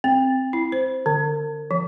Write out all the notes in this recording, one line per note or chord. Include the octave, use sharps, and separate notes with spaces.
C4
E4
C5
D3
F3